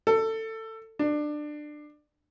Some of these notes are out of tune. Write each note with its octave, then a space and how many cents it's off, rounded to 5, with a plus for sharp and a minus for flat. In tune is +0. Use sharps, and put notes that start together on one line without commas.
A4 +20
D4 +20